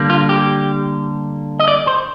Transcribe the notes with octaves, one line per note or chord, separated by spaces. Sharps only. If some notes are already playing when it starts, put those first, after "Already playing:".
Already playing: D3 G3 A#3
F4
G4
D#5
D5
C5